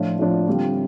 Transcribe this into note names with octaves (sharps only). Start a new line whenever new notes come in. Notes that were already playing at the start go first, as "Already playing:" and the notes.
Already playing: A2 F3 D4 F4
A2 F3 D4 F4
D3 G3 C4 F4